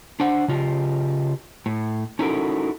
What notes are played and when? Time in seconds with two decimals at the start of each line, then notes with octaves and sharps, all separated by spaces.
0.20 D4 C5 F#5
0.48 C#3 F4 G4
1.66 A2
2.19 C#4 D#4 E4 F#4 A4 A#4